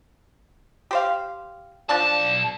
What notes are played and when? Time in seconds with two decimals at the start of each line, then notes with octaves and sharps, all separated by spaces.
0.91 G4 C5 F5
1.89 B1 F3 D4 D5 A5